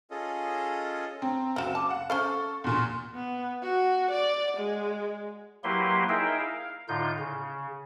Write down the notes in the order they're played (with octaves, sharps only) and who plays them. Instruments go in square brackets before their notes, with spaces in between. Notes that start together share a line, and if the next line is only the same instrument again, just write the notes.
[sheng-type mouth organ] C#4 F4 G#4 A4 D#5
[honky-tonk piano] C4 [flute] A#5
[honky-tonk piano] F#1 E7 [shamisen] C4 F#4 [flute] F5
[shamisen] A5 [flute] D6
[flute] F5 [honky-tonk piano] F#5
[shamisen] C#4 C5 F5 [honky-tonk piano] A4 [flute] C#6
[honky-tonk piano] E2 A#2 [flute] C6
[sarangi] B3
F#4
D5
G#3
[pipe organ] F#3 A#3 E4 G4 B4 C6
D#4 E4 G#4 A#4 E5 G5
F5
A2 D3 D#4 F4 G6
C#3